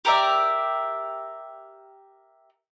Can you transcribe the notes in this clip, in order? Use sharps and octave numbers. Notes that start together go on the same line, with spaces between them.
G4 A#4 D5 E5